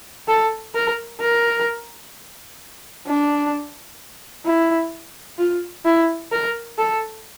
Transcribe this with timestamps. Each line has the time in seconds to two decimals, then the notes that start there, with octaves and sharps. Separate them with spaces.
0.28 A4
0.75 A#4
1.21 A#4
3.07 D4
4.46 E4
5.39 F4
5.85 E4
6.32 A#4
6.78 A4